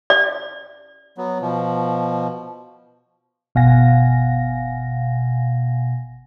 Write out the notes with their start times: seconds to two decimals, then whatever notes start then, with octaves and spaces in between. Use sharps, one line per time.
0.10 D5
1.18 F#3 B3
1.41 B2 F3
3.55 G1 B2 F5 F#5 G#5 A#6